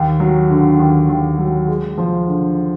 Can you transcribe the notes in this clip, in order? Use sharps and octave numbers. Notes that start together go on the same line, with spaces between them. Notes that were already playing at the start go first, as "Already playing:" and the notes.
Already playing: D#2
F#3
D3
D#2
D#2
F#3
G#3
F3
D3